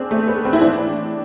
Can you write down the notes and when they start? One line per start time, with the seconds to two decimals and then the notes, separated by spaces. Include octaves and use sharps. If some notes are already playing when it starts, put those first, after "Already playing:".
Already playing: C4 D4 G#4
0.11 A3
0.28 B3
0.45 C4
0.53 E4
0.61 A2 E3 D4